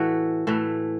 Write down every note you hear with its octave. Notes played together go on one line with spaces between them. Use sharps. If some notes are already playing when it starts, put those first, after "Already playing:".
Already playing: A2 E3 A3 F#4
A2 E3 A3